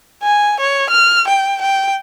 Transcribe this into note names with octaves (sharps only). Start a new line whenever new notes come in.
G#5
C#5
F6
G5
G5